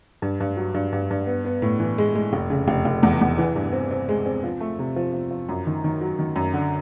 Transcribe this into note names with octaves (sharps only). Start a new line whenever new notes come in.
G2
G2
F#3
G2
G2
G2
B3
B3
A2
E3
G#3
G#3
F1
C#3
F1
F1
E2
E2
E3
G2
C4
C4
G#3
C4
F3
A3
C3
F3
F3
F3
F#2
D#3
D#3
F#3
D#3
F#2
D3